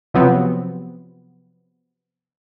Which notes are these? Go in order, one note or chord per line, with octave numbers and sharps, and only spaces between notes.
C3 F3 F#3 B3 C4